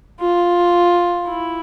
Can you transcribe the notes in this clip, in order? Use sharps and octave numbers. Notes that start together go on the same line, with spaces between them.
F4
E4